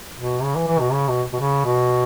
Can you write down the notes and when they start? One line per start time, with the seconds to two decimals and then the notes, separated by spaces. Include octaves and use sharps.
0.18 B2
0.43 C#3
0.56 E3
0.68 E3
0.80 B2
0.92 C#3
1.08 B2
1.33 B2
1.40 C#3
1.65 B2